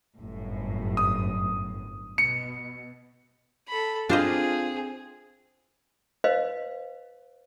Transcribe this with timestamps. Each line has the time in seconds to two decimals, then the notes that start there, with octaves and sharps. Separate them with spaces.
0.19 G1 F#2 A2
0.97 D#6
2.18 B2 C#7
3.68 A4 B5
4.09 C4 D4 F4 G#4 C5 D#5 F5
6.24 B4 C5 D#5 F5